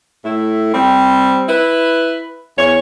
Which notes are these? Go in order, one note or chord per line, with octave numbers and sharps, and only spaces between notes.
A2 A3 E4
G3 C4
E4 B4
E2 C#5